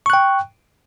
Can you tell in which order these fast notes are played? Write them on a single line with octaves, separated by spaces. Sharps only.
C#6 F#6 G5